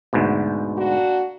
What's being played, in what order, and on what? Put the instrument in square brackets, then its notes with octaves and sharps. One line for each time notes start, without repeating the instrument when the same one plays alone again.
[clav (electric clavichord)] D2 G#2 B2
[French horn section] A#3 D4 F#4